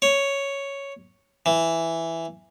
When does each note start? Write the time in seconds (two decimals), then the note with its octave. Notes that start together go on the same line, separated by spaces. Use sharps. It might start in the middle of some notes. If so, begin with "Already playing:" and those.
0.02 C#5
1.46 E3